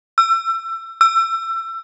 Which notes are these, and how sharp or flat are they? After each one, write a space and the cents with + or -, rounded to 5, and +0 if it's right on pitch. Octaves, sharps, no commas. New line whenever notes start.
E6 +30
E6 +25